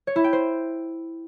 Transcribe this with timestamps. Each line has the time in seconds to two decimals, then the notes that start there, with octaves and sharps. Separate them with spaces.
0.07 C#5
0.16 E4
0.24 G5
0.33 C5